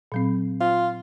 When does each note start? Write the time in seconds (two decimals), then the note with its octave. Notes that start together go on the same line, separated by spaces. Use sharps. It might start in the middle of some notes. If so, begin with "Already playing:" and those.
0.12 A#2 F#3 C4
0.61 F4